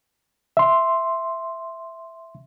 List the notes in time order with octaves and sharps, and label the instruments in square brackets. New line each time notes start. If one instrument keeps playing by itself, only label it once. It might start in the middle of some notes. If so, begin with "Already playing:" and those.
[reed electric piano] E5 C6